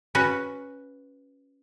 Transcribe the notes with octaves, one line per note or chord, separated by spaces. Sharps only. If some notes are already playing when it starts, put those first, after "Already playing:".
C#4 F#4 B4